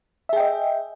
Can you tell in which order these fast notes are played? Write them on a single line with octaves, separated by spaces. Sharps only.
E5 G#4 G5 D#5